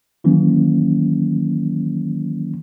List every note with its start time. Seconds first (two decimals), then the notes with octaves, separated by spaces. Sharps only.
0.24 D#3 E3 F#3 A#3 C#4